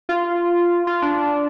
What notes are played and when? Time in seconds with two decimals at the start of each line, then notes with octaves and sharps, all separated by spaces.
0.09 F4
0.87 F4
1.02 D4